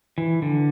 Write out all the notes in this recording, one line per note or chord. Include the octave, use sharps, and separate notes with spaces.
E3
D3